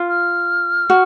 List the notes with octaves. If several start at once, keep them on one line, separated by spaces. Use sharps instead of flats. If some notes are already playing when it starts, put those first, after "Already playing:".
Already playing: F4
F6
F#4